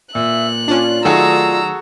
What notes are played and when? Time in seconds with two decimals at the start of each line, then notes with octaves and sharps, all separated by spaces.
0.15 A#2 E5 E6 F#6
0.68 C#4 D4 F4 D5
1.05 D#3 F#3 A3 F#4 G#4 A4 A#5 E6